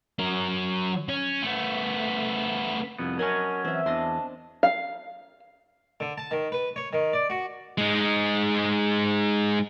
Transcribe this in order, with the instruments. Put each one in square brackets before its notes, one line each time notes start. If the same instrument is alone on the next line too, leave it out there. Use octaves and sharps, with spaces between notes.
[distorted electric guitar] F#3 A#4
C#4
A3 B3
[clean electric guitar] C2 F2 B3
[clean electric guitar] F#3 C#4 [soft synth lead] A#4 [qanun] D#5 G#5 A5
[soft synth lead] E3 [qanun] C4 E5
[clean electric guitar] E2 [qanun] D4 D#5 C6 [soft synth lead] A5
[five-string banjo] F5
[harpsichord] D3
A5
D#3
B4
C#5
D#3
D5
F#4
[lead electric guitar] G#3 D#4